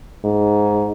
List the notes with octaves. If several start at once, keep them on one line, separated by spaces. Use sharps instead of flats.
G#2